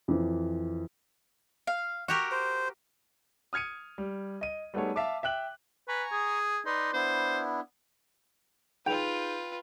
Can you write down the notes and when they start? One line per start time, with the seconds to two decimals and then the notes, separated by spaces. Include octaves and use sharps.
0.08 F2 E3
1.67 F5
2.08 F#4 G4 A#4 C#6
2.32 C5
3.53 D#6 F6 G#6 C#7 D#7
3.98 G3
4.41 D#5 D#7
4.74 G3 A3 B3 D#4 G#4 C#5
4.96 E5 F5 A5 D6
5.23 E5 G5 F#6 F#7
5.88 B4 G#5 A#5 C#6
6.12 G#4
6.66 D#4 B4 D5 C6
6.94 B3 D4 E4 C5
8.86 D#4 F4 G#4 B4 G5 F7